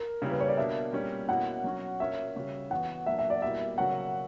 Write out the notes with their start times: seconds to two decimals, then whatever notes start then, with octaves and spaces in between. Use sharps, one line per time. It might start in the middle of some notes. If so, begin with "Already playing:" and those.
Already playing: A#4
0.22 C#3 G3 A#3 E4
0.31 B4
0.40 C#5
0.48 D5
0.57 B2 A#3 D4 E5
0.93 A#2 G3 C#4
1.29 B2 A#3 C#4 E4 F#5
1.64 F#3 C#4 F#4
2.00 A#2 A#3 C#4 F#4 E5
2.36 C#3 G3 C#4 F#4
2.70 E3 B3 F#4 F#5
3.06 A#2 F#3 A#3 D4 E5
3.19 E5
3.30 D5
3.42 B2 G3 A#3 E4 E5
3.78 C#3 F#3 A#3 C#4 F#4 F#5